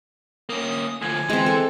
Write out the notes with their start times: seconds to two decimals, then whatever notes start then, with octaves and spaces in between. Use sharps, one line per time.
0.49 A#3 C#4 D#6
1.02 D2 F3 G#5
1.30 E3 G#3 C4
1.46 A4